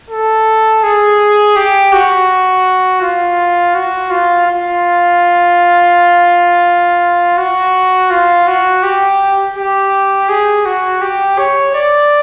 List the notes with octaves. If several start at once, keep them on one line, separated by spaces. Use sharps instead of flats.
A4
G#4
G4
F#4
F4
F#4
F4
F4
F#4
F4
F#4
G4
G4
G#4
F#4
G4
C#5
D5